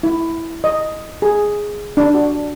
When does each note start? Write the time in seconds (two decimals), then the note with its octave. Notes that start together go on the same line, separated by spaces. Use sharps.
0.03 E4
0.64 D#5
1.22 G#4
1.97 D4
2.15 F#4